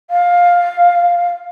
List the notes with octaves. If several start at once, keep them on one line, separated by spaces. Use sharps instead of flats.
F5